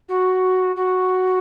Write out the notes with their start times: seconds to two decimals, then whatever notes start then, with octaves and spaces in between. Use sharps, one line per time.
0.08 F#4
0.76 F#4